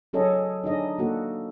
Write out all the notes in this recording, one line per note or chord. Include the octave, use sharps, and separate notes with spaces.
F#3 C#4 G#4 A4 C#5 D#5
D4 D#4 G#4 D#5
A#3 F#4 A4